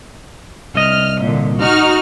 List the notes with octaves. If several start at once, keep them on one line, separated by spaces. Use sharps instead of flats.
C2 D#5 F6
A#2 D3
D#4 F#4 F6